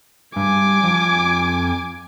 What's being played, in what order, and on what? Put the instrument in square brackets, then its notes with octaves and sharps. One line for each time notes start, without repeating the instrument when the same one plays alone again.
[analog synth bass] G2 [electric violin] G#5 D6
[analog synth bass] F2